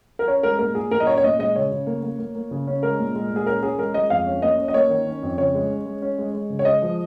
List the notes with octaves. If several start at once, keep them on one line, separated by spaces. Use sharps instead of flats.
A#4
C#4 C#5
G#3 A#4
A#2 A#4
A#2 G#4
A#2 A#4
D#5
C#4 C#5
C#5
A#2 D#5
G#3 D#5
C#3 C#5
C#3
A#3
A#3
A#3
A#3
C#3
C#4
G#3 A#4
A#2
G#3
A#2
G#4
C#4 A#4
C#4 G#4
G#3 A#4
G#3 D#5
F2 F5
C#4
A#3 D#5
C#4
D#5
A#3 C#5
D#3
C#4
F2
C#3 C#5
G#3
C#4
G#3
C#4
G#3
G#3
C#3
C#5
G#3 D#5
F3